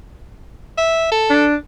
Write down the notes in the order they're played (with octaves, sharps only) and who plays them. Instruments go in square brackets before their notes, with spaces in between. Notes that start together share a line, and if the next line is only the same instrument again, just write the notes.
[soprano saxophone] E5
A4
[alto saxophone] D4